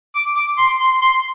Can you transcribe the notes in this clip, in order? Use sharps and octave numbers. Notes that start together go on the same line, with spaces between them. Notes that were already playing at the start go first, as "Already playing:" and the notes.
D6
D6
C6
C6
C6